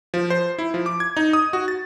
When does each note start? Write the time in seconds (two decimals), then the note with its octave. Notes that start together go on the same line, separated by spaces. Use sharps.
0.14 F3
0.30 C5
0.59 E4
0.74 F3
0.86 D6
1.00 G#6
1.17 D#4
1.33 D#6
1.53 F#4
1.68 A6